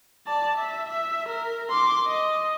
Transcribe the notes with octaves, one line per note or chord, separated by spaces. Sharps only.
D5 A5
E5
E5
A#4
C6 D6
D#5